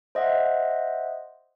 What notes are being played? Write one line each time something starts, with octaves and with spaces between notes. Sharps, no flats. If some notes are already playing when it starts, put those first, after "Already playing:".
C5 D#5 E5 F#5